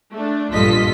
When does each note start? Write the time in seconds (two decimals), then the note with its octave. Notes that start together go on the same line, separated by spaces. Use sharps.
0.13 A3 D4
0.50 A#1 G2 F4 A4 D#5 B6